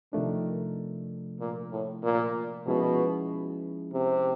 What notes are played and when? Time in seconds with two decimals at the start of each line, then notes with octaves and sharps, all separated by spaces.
0.13 C3 D#3 F3 A3 D4
1.40 A#2
1.72 A2
2.03 A#2
2.67 B2 F3 G#3 C#4 E4 G#4
3.93 C3